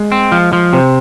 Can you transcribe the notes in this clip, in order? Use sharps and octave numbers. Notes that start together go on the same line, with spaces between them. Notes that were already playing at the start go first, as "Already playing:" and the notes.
Already playing: G#3
C4
F3
F3
C3 C4